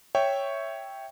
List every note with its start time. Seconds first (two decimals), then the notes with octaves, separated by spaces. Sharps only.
0.15 C#5 E5 G5 C#6